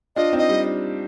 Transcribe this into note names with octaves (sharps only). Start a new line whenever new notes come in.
D4 F4 D#5
C4 D#4
D#5
G3